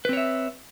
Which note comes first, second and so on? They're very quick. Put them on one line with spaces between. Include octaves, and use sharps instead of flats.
B4 C4 C#5 E5